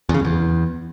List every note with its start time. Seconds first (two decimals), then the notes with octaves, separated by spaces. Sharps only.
0.09 E2
0.14 C#3
0.19 F#2
0.25 E2